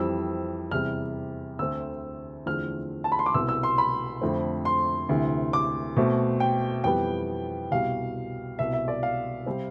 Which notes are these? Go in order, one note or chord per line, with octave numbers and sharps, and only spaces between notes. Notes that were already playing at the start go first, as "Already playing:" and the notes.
Already playing: F2 E3 G3 C4 E6
E2 C3 G3 F6
D2 D3 A3 C4 E6
E2 D3 F3 A3 C4 F6
A5
B5
C6
D6
C2 B2 B3 E6
E6
C6
B5
F2 D3 A3 C4
C6
D2 C3 E3
D6
B2 A3 C4
G5
F2 E3 G3 B3 G5
C2 B2 G3 F5
C2 B2 B3 E5
E5
D5
F5
C3 G3 C4